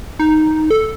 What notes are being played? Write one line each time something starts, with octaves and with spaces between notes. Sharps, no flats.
D#4
A4